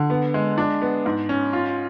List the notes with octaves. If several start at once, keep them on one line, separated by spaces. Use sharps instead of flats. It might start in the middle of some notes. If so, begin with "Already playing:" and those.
Already playing: D3
B3
G#3
D4
B3
G#2
C#4
F4